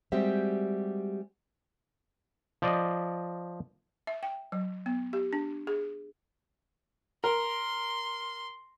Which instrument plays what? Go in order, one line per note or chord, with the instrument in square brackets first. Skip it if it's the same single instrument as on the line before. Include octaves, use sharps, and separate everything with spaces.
[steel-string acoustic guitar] G3 G#3 C4 F#4 G4 E5
[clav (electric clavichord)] F3 D5 D#5
[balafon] E5
G5
F#3
B3
G4
D4
G#4
[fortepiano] A#4 [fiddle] C6